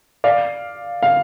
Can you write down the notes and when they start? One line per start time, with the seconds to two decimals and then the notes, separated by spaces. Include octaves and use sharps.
0.24 D5 F5
1.03 F5